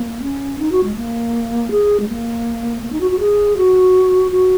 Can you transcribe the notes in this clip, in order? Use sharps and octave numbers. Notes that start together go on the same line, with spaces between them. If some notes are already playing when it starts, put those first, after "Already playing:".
Already playing: A#3
C#4
D#4
F#4
G#3
A#3
G#4
G#3
A#3
A#3
D#4
F#4
F#4
G#4
F#4
F#4